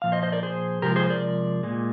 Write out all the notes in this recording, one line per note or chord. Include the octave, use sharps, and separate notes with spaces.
A#2 F3 F5
C5 D#5
C5 D#5
A#4 D5
G#4 C5
C3 F3 G#3 G4 A#4
G#4 C5
A#4 D5
A#2 G#3